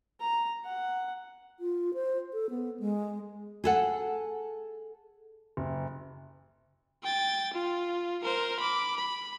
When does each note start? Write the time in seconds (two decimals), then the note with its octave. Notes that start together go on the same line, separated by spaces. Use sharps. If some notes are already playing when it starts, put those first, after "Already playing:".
0.20 A#5
0.65 F#5
1.60 F4
1.94 C5
2.33 A4
2.50 B3
2.80 G#3
3.64 G#4 A4 F#5
5.57 F#1
7.04 G5 A6
7.53 F4
8.24 A#4 C5
8.60 B5 D6
8.97 B5